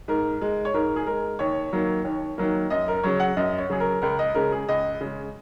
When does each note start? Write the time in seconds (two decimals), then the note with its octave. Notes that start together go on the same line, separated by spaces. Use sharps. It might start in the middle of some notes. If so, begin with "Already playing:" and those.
0.08 G#2 A#4
0.41 G#3
0.65 C#5
0.74 G#2 A#4
0.96 G#4
1.07 G#3 A#4
1.39 D#2 C#5
1.73 D#3 F#3 A#3
2.05 D#2
2.38 D#3 F#3 A#3
2.70 F#2 D#5
2.88 A#4
3.04 C#3 F#3 C#5
3.20 F#5
3.37 F#2 D#5
3.58 C#5
3.70 C#3 F#3 G#4
3.80 A#4
4.02 C#2 A#4
4.19 D#5
4.35 C#3 G#3 A#4
4.52 G#4
4.68 C#2 D#5
5.01 C#3 G#3